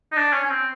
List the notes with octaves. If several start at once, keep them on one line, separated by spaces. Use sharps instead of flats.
D#4
D4
C#4
C#4
C4